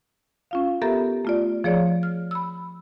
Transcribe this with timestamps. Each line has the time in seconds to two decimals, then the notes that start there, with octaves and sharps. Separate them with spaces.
0.51 C#4 F4 F5
0.82 B3 G4 A4 A#4 E5 A#5
1.25 A3 F4 D5
1.64 F3 G#4 C#5 D5
2.03 F6
2.31 B5 E6